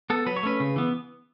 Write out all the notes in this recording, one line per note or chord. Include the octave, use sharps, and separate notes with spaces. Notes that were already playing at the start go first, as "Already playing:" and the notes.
B3 A4
F#3 B4
C#5
A3 C#4 B4
C#3
E3 B3